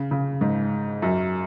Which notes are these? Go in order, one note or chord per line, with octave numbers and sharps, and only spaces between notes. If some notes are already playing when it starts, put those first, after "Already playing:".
Already playing: C#3
C#3
G#2
F#2